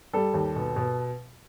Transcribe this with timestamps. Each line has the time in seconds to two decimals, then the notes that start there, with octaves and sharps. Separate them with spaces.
0.13 G3 A4
0.34 D#2
0.56 B2
0.76 B2